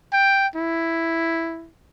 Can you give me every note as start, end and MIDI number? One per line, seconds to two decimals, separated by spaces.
0.13 0.47 79
0.56 1.70 64